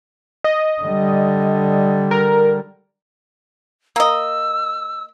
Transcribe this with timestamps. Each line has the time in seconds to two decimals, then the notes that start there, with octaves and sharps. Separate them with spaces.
0.44 D#5
0.82 D3 G3
2.11 A#4
3.96 A#3 D#5 E6